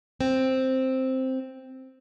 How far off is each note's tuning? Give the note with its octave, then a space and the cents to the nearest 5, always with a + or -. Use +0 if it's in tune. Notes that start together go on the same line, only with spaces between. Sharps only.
C4 +0